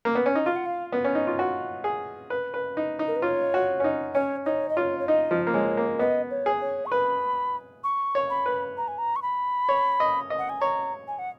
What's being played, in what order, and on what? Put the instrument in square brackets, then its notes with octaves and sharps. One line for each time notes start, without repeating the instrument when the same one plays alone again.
[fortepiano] A#3
B3
C#4
D#4
[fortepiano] F4 [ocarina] F5
[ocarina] F#5
F5
[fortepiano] B3
C#4
D#4
F4
F#4
G#4
B4
B4
D#4
D#4
[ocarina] A#4
B4
[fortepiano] F4 [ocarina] C#5
[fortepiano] F#4
C#4
D#4
[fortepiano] C#4 [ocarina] C#5
[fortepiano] D#4 [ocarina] C#5
[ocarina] D#5
[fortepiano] F4 [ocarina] C#5
[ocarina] C#5
[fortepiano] D#4 [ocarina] D#5
[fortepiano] F3
A#3
[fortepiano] G#3 [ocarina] C#5
[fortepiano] A#3
[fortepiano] B3 [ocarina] D#5
[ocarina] C#5
[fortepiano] G#4
[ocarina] C#5
C#6
[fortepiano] B4 [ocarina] B5
[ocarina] C#6
[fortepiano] C#5
[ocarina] B5
[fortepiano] B4
[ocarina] A#5
G#5
A#5
C#6
B5
[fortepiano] C#5
D#5
D#5
[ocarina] F#5
G#5
[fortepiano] C#5 [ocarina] A#5
[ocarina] G#5
F#5